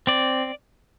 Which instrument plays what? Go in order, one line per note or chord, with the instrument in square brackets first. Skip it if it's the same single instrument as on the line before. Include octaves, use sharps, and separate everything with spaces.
[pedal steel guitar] C4 D5